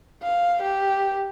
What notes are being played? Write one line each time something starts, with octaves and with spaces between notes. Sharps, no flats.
F5
G4